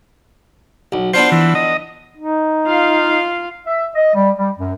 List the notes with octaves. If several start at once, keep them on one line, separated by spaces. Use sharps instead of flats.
B1
B3 D4 F4 C5
E3
D#5
D#4
F4 F5
E5
D#5
G3
G3
F#2